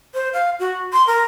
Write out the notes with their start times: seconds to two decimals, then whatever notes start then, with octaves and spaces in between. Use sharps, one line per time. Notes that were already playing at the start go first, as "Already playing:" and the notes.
0.14 C5
0.33 F5
0.59 F#4
0.93 C6
1.07 A#4